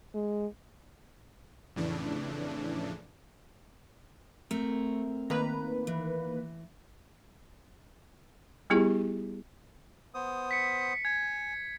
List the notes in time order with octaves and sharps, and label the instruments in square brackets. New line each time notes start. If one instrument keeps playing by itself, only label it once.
[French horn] G#3
[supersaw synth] F2 A2 C#3 E3 D4
[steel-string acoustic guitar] A3 [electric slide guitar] C4 A#4
[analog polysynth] D#3 A#3 B4 [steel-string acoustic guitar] A#5
[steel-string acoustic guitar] E3
[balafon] G3 B3 E4 F4 G4 G#4
[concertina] B3 C5 D#6
[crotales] B6 C#7
B6
[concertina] G#5 [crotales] G#6